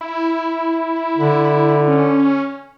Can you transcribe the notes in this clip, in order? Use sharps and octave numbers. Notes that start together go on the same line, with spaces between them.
E4
D3
C#4